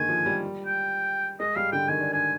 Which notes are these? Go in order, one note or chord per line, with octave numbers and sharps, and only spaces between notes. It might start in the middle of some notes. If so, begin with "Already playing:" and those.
Already playing: D3 D#3 G#3 A#3 G#5
F3
G3
G5
G#3 D#5
G3 F5
D3 G5
D#3 G#5
D4
D4 G#5